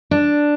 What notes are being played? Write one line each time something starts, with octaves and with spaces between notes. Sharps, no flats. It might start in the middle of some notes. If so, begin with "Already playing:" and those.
D4